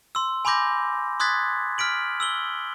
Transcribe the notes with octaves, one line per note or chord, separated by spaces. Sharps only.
C6 E6
G#5 B5 C6 D6 G6 A#6
C6 D#6 F#6 G#6 A6 B6
F6 B6 D7 F#7
E6 F#7 G7